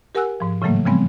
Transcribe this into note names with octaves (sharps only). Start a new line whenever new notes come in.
G4 A#4 F#5 G#5 E6 F#6
G#2 F3
A2 C#3 E3 F#3 A3 A#3
C#3 F3 G3 G#3 B3 C4